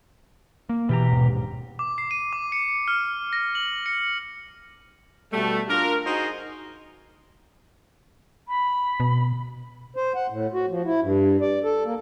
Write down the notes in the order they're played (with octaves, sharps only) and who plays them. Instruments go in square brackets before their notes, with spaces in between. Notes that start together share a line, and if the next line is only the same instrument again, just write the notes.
[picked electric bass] A#3
[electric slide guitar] B2 G4 A#5 [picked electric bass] E3
[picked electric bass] D#1 G#2
[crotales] D6
C7
D#7
D6
C#7
F6
A#6
F#7
C#7
[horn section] B2 G3 A3
D4 F4 A#4
D#4 F#4 G#4 C5 D#5
[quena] B5
[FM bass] B2
[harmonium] C5
F#5
A2
F#4
F3
E4
G2
D5
A4
A#3